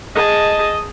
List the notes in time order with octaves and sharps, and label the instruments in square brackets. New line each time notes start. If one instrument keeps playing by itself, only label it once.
[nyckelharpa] G#4 A5 [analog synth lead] D#5